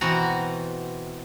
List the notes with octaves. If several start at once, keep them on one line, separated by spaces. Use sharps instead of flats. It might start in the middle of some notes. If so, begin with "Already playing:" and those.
B2 E3 C4 F#4 F#5 A#5